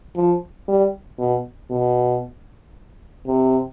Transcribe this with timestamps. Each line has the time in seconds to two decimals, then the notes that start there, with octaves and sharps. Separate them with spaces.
0.16 F3
0.68 G3
1.19 B2
1.71 B2
3.26 C3